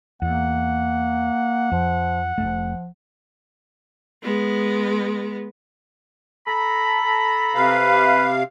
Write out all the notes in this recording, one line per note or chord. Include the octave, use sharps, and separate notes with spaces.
E2 A#3 F#5
F2 F3
F1 D#2 F3 A3
G#3 B3
A4 A#5 B5
C3 B4 F5